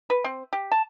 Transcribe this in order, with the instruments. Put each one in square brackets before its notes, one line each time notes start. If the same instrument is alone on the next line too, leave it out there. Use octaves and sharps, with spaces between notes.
[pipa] B4
C4
G4
A5